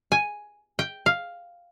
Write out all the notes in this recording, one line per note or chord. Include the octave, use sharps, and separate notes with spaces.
G#5
G5
F5